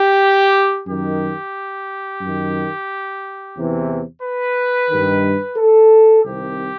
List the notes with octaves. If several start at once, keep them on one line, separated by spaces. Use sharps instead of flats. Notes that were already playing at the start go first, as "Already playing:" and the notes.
Already playing: G4
F#2 D#3 G4
F#2
D#3
E2 C3 E3
B4
G2 D#3
A4
C2 C3 D#3 G4